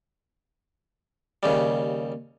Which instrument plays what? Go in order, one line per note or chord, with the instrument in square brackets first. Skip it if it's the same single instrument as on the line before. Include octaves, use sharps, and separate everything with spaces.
[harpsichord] D#2 C#3 G3